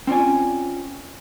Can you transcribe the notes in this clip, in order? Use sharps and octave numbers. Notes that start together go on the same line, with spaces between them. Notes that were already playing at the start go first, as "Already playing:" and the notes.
C4 C#4 F4 D5 G#5